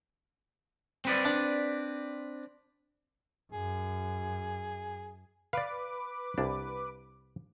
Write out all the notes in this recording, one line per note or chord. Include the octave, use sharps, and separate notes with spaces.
C4 B4 D5
D4
F#2 G#4
B4 D5 F5 D6
C2 D4